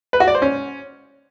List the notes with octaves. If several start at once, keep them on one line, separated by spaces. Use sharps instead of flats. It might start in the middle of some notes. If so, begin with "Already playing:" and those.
B4
F#4
D5
C5
C#4